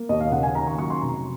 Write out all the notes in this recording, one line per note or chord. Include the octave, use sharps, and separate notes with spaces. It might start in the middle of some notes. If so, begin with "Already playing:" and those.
Already playing: A#3
D#2 D#5
F5
C#3 F#5
G#5
D#3 A#5
C#6
F#3 C#6
C6
F1 A#5